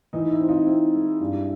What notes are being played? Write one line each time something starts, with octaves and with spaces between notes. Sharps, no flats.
E3 D#4
E4
C4
D#4 F4
C4 E4
G#3
G2